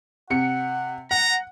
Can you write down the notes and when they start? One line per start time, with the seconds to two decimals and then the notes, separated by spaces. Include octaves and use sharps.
0.30 C3 F#5 C#7
1.11 F#5 A#5